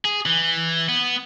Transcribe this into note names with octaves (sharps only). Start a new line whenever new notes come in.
G#4
E3
B3